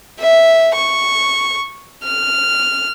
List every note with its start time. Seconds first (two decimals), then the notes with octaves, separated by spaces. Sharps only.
0.19 E5
0.75 C#6
2.03 F6